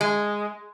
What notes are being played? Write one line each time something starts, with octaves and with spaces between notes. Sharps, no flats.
G#3